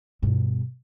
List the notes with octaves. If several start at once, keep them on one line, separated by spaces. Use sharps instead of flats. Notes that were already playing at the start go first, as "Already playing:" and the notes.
G2 B2